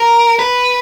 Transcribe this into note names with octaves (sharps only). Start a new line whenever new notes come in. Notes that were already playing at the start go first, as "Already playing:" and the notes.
Already playing: A#4
B4